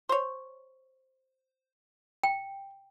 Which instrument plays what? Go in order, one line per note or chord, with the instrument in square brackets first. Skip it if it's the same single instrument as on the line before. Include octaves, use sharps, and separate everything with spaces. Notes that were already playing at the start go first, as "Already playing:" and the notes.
[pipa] C5 C#5
[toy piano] G5